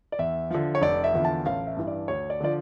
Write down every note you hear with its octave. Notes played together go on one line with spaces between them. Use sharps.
D5
E2 E5
D3 F3
C#5
F1 D5
E5
E2 D3 F3
A5
A1 F5
E5
G2 E3
D5
D2 C#5
D5
D3 F3 D5